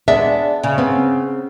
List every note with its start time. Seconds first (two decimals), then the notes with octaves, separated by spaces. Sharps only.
0.08 G#3 B3 D4 E5
0.63 C#3
0.78 B3 C4